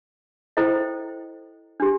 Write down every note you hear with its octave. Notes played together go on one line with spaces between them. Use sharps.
E4 A4 C5 D#5 G5
D4 G4